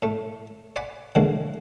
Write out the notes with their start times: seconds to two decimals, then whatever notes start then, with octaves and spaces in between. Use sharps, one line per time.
0.02 A2 A3
0.76 D5 F#5 G#5 B5 D6
1.15 B2 D3 E3 F#3 G#3 A#3